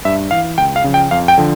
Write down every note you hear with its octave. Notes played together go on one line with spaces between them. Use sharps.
G2 E5
E3 F5
C#2 G5
F5
C#3 F3
G5
F2 F5
G5
D3 F3